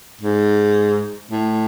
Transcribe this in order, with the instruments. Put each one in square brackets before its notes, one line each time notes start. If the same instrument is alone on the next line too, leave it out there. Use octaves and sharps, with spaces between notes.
[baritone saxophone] G#2
A2